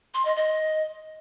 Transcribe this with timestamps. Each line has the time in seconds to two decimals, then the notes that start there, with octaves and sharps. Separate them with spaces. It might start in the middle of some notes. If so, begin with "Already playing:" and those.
0.14 C6
0.25 D#5
0.36 D#5